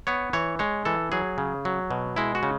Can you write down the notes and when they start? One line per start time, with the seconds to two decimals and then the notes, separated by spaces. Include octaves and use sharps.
0.07 B3 C#5
0.33 E3 C#5
0.59 G#3 C#5
0.85 E3 A4
1.12 F#3 G#4
1.38 C#3
1.65 F#3
1.91 B2
2.16 G#3 E4
2.35 F#4
2.43 C#3